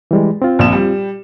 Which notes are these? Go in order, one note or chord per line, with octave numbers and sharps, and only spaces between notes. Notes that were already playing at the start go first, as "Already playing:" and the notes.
E3 G3 G#3
C4 F4
A#1 E7
G3